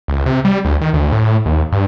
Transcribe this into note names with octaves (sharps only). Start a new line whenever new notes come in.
C#2
C3
G3
D2
D#3
D2
A2
D#2
G2